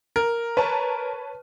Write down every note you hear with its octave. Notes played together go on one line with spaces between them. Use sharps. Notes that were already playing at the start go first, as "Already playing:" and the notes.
A#4
B4 C#5 A5